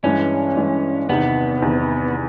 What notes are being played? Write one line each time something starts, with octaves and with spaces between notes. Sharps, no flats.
G2 E3 G#3 C#4
G2 E3 G#3
E2 C3 D#3 B3
E2 C3 D#3